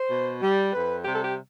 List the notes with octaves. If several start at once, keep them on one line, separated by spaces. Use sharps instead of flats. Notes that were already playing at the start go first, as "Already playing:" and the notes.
Already playing: C5
B2
G3
F2 B4
C3 G3 G4
A4
G4